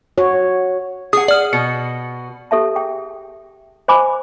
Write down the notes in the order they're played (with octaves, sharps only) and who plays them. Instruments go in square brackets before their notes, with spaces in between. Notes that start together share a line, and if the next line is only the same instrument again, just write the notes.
[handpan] F#4 C#5
[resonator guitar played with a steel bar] G#4 F#5 [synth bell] D#6
[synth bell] D5 F6
[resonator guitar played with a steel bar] B2 [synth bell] C#7
[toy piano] G4 A4 E5 A5
G#4 G5
C5 D#5 G#5 B5 D6